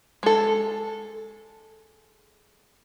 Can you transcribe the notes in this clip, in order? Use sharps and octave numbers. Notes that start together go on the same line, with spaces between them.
G#3 A4